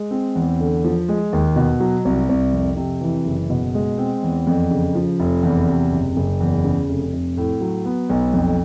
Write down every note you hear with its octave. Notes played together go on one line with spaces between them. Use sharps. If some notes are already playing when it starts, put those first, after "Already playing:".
Already playing: G#3
C4
E2
D3
F3
G#3
D#2
B2
F#3
C2
C2
F2
C3
E3
F#1
B2
G#3
C4
E2
F2
C#3
F3
F1
E2
C3
F#1
F#1
E2
C#3
F1
F1
A2
F#3
B3
B1
F2